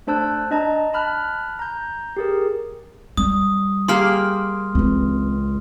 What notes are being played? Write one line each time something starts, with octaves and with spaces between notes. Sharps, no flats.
A3 D4 C5 A5 E6 F#6
D4 D#5 A5 A#5
A5 B5 F6 F#6
A#5 G6
G4 G#4 A#4
G3 D#6
A#3 G4 G#4 C6 F6
C#2 E3 C4